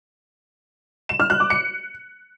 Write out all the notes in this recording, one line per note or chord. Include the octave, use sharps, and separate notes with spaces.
E7
F6
F#6
D6
C#7